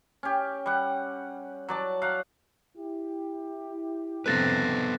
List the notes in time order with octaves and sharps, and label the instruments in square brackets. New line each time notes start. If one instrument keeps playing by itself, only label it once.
[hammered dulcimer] C#4 G4
G3 F#5
F#3 D5 A5
F#3 F5 F#5
[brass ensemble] E4 G4
[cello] F2 C3 [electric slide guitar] B3 A4 B4 [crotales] F#6 A6 A#6